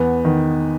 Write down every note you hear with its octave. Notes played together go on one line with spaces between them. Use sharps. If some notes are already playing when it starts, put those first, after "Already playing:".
Already playing: E2 B3
D#3